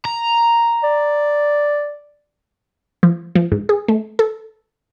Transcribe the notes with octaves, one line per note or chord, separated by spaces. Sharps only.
A#5
D5
F3
F3
G#2
G#4
A3
A4